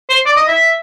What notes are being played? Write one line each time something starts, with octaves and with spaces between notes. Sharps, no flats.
C5
D5
D#5
E5